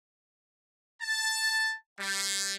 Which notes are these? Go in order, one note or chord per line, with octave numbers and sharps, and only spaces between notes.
A5
G3